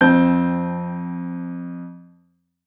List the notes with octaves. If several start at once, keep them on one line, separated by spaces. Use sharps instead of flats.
F2 C4 A5 G6